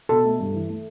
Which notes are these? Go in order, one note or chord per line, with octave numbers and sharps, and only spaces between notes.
B2 A4
A3
G2
E3
A3